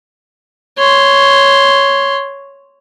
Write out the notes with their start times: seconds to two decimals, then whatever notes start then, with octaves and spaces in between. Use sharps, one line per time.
0.77 C#5 C6